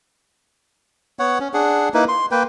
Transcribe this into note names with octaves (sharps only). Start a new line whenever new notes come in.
B3 C#5 F#5
C#4
D4 G#4 F#5
A#3 D#4 E4 B4
C6
A#3 B4 G5